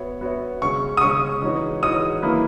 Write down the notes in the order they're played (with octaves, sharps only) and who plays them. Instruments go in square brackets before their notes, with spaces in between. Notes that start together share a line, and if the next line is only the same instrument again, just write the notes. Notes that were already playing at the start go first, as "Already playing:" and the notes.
Already playing: [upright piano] B3 F#4 C#5 E5
B3 F#4 C#5 E5
[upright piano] C#3 G#3 C#4 [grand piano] C#6
[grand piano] D#6
[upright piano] C#3 G#3 C#4 [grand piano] C#6
[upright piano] E3 G#3 D#4 F#4 C#5
[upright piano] E3 G#3 D#4 F#4 C#5 [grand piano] D#6
[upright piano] E3 A#3 E4 B4